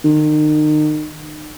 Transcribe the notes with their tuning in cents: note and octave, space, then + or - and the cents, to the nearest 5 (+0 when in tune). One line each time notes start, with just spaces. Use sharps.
D#3 -35